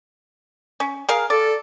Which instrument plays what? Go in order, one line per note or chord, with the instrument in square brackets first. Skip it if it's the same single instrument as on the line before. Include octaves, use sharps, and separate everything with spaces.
[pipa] C#4
G#4 A#4 F5
[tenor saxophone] A4 [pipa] D5